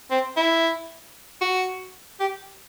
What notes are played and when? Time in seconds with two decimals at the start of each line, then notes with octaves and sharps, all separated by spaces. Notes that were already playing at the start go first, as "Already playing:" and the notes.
0.11 C4
0.37 E4
1.41 F#4
2.20 G4